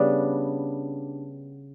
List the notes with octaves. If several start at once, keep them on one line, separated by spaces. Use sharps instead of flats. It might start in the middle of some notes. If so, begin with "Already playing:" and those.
Already playing: C#3 G3 B3 D4